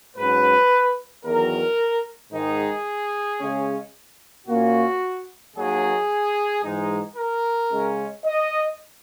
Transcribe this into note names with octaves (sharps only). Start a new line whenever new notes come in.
G#2 F#3 C#4 B4
E2 D#3 F#3 A#4
G#2 D#3 G#3 D#4 G#4
C#3 G#3 C#4
A#2 A#3 C#4 F#4
D#2 D#3 F#3 G#4
G#2 E3 G#3 D#4
A#4
C#3 G#3 C#4
D#5